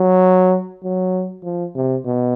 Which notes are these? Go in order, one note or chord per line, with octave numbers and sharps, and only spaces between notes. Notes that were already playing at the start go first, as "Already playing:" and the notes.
Already playing: F#3
F#3
F3
C3
B2